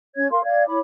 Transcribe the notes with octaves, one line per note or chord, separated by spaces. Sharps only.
C#4 C#5 G#6
A#4 F5 C6
D5 F5 G#6
E4 C#5 B5 D6